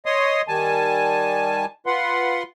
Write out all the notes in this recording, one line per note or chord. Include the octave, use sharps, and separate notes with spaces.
C#5 D#5 C6 D#6
D#3 G3 G#5 A5
F4 B4 F#5 C6